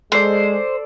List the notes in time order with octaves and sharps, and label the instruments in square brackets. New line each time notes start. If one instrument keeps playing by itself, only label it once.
[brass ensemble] G#3 [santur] A4 D5 [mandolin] C5